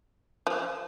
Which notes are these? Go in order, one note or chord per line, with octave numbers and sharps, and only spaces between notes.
F3